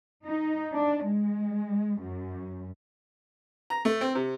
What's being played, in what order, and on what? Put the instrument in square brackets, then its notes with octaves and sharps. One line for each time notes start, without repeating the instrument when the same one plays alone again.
[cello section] D#4
D4
G#3
F#2
[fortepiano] A#5
A3
C4
C3